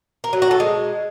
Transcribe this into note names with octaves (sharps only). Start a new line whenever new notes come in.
A#4
F#3
F#4
A4
G#3